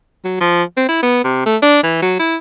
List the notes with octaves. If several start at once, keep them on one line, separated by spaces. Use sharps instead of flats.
F#3
F3
C4
E4
B3
C3
A3
D4
E3
F#3
E4